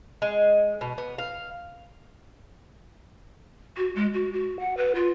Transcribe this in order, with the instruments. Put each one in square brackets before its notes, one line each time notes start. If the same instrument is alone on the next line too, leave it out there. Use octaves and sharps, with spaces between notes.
[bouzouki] G#3
B2
B3
F5
[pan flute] F#4
G#3
F#4
F#4
F#5
B4
F4